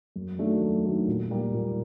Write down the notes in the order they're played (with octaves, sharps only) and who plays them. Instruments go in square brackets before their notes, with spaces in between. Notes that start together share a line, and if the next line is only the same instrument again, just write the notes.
[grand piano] F#2
D#3 F#3 A3 D4
F#2
D#3 F#3 A3 D4
A#2
G3 A#3
A#2